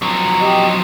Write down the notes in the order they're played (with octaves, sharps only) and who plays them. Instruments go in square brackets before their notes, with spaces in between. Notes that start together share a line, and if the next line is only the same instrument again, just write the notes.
[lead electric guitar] F3 F#3
[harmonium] G4 D#5